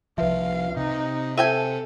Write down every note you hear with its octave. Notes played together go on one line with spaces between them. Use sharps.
C2 F3 B4 E5 F5
C3 D#4
A4 C5 E5 G5 G#5 D#7